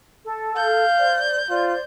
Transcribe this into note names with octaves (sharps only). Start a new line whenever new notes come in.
A4
F5 G6
C5 D5
F4 C5 D5